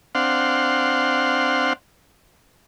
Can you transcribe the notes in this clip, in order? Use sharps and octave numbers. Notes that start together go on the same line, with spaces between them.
C4 D4 F5 F#5 C6